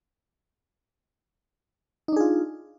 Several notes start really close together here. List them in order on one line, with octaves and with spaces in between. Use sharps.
D#4 D4 G#4 F4